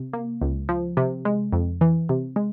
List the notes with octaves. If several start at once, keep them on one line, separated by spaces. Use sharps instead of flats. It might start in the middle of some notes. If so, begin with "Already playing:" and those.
Already playing: C3
A#3
C#2
F3
C3
G#3
F2
E3
C3
G#3